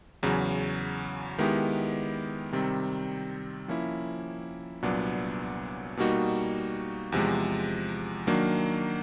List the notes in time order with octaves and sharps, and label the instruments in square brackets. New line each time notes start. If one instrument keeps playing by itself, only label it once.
[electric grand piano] E2 C#3 F#3
D#3 G#3 B3 E4 G4
C3 D#3 G3 C4
F3 A#3 C#4 E4
C2 A#2 F#3 B3 D4
B2 G3 A#3 D#4 F#4
E2 C3 F3 G#3
D#3 F#3 A#3 D4